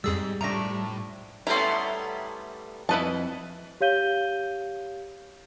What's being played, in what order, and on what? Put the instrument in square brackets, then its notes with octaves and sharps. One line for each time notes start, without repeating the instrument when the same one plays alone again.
[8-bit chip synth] F2 G#4 E6 [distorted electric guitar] G#2 [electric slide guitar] G3
[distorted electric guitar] A2 [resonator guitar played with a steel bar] F3 A3 D4 [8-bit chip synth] A#5 A#6
[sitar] G3 A3 B3 [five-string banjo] C#4 E4 [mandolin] A#5 C6
[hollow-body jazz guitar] F2 D#5 B5 [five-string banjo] E4 B4 A5
[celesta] G4 C#5 F5 G6 D#7 G7